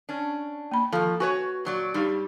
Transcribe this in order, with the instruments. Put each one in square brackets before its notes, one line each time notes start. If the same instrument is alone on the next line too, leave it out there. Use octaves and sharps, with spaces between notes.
[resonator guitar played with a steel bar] C#4 D4
[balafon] A#3 B5
[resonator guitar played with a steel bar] D#3 F3 [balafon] A4
[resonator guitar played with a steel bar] F#4 B4 C#5 [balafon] G#5
[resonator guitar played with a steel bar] A#2 F#3 D5
[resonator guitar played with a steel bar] G2 G3 [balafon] D#4 G4